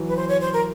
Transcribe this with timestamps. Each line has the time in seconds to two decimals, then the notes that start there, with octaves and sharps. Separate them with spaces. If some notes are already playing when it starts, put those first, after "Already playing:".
Already playing: E3 F#3
0.08 B4
0.17 C5
0.29 C#5
0.41 C5
0.53 A#4